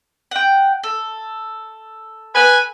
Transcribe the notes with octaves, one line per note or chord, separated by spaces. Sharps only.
F#5 G5
A4
B4 G#5